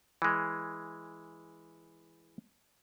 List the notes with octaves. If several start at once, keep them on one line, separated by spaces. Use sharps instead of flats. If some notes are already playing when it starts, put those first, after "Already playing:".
E3 G#3